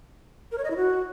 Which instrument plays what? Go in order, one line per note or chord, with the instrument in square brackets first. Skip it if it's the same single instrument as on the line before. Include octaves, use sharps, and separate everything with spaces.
[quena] A#4
C#5
D#5
E4
F#4